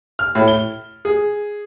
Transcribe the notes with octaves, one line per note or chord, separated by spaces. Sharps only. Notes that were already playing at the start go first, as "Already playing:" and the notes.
F6
A2
G7
G#4